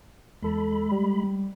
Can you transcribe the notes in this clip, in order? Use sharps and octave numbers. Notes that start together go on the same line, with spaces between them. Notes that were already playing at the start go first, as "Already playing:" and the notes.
E2 G#3 A4 B5
G3